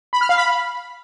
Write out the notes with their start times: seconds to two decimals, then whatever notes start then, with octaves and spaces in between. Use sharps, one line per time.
0.13 B5
0.21 F6
0.29 F5
0.37 B5